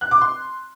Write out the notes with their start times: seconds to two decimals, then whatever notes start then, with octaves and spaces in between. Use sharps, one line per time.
0.01 F#6
0.11 D6
0.21 C6